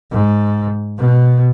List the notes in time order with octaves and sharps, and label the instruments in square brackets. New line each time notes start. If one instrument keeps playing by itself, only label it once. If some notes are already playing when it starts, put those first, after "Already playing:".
[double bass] G#2
B2